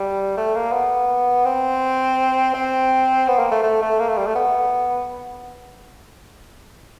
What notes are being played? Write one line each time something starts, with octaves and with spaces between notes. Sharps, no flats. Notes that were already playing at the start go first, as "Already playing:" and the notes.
Already playing: G3
A3
A#3
B3
C4
C4
B3
A#3
A3
A3
A3
A#3
A3
G3
A3
B3